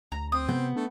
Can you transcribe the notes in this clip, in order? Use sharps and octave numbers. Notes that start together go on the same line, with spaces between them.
D2 A#5
C4 D#6
C3 B3 G6
A3 D4